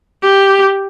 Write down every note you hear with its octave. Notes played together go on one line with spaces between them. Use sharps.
G4